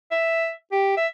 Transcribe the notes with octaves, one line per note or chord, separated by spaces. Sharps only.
E5
G4
E5